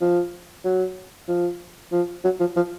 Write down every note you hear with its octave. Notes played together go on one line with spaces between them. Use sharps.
F3
F#3
F3
F3
F#3
F3
F3